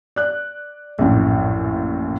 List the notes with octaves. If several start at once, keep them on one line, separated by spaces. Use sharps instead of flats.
D5 F#6
A#1 F#2 A2